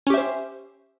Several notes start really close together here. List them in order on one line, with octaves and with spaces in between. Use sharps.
C#4 G4 E5 C5